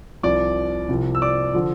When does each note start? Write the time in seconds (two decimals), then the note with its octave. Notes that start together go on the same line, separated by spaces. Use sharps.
0.23 C2 C3 F3 D5 D6
0.89 C2 C3 F3
1.15 E6
1.22 D5 D6
1.54 D3 F3